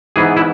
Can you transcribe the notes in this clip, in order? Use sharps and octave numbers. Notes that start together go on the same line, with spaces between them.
G#2 E3 B3 G#4
E4